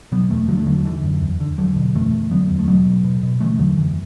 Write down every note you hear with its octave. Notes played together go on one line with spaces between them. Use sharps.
B2 F#3 B3
E2 E3 A3
D3 F#3
A3
E2 D3 F#3
D3 E3
F#2
E2
D3
E2 D3 F#3
B2
F#2 E3 A3
F#2
D3 F#3 B3
E2
A3
B2 F#3 B3
B2
B2
B2
D3 E3 A3
E2 D3 F#3
F#2 E3